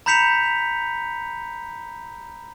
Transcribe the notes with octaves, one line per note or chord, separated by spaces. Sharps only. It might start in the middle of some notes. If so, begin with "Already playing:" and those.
A#5 B5 G6 B6 C#7 F7